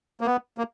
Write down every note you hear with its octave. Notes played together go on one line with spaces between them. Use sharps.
A#3
B3
A#3